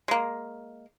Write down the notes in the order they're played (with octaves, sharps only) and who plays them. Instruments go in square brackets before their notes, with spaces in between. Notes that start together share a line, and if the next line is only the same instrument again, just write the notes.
[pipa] G#3 A#3